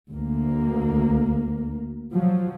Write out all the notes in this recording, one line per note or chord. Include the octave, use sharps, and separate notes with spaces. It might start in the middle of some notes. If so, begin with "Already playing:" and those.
D2 A#3
F3 F#3